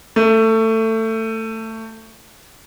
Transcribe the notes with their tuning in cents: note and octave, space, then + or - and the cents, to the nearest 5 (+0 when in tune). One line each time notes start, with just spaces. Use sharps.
A3 +20